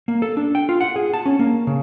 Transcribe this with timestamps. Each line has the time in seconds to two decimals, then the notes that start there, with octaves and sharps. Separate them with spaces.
0.08 A#3
0.22 A4
0.37 D4
0.55 G5
0.69 F4
0.81 F#5
0.96 G#4
1.14 A5
1.26 C#4
1.39 A#3
1.67 C#3